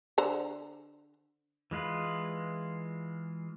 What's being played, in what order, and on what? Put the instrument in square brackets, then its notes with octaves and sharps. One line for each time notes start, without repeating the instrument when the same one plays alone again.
[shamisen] D3 C5 A#5
[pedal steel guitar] E3 G#3 F4 B4